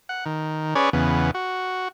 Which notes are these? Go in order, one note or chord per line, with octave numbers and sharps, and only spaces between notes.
F#5
D#3
C#4 G#4 B4 C#5 D5
E2 C#3 B3
F#4